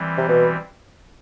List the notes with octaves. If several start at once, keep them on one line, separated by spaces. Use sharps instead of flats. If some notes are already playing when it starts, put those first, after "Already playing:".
Already playing: E3 G3 C4
C3
B2